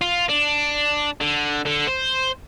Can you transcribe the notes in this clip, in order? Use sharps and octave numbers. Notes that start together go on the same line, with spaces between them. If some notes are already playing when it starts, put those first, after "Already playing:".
F4
D4
D3
D3
C5